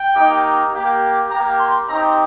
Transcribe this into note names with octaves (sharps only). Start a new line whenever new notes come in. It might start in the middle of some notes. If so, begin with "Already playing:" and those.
Already playing: G5
A#3 D#4 G4
A#3 G4
A#3 G4 A#5
C6
C4 D#4 G4 A#5